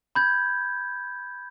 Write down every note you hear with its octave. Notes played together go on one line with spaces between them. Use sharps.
B5 G6 G#6